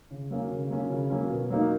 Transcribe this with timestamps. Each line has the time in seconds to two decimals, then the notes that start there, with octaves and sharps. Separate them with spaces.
0.11 C#3
0.31 F#3 A#3 C#4
0.51 C#3
0.70 F#3 A#3 C#4
0.90 C#3
1.10 F#3 A#3 C#4
1.30 B2
1.50 F#3 A#3 D#4